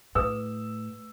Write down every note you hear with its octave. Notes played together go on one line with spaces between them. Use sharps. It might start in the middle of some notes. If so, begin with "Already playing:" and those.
A2 G#4 B4 D#6 E6